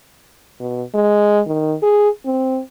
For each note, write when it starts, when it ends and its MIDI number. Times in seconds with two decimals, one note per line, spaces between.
0.60 0.83 47
0.94 1.40 56
1.47 1.75 51
1.83 2.09 68
2.26 2.60 60